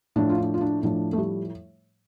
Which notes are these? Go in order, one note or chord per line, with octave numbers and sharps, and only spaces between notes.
A2 F3 D4
F4
D4
F4
D4
A2 F3 D4
A3
G3